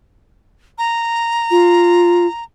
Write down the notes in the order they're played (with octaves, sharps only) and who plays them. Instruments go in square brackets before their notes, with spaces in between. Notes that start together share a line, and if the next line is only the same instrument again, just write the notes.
[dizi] A#5
[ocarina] F4